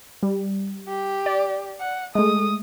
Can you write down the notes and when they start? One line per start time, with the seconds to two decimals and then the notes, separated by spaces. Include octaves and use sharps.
0.23 G3
0.88 G4
1.26 D5
1.80 F#5
2.15 G#3 A3 D#6